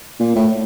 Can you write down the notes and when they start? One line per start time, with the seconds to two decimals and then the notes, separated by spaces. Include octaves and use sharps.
0.20 A#2
0.36 A2